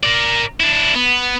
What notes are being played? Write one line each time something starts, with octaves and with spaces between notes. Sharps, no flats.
A#4 D5
D4 E4
B3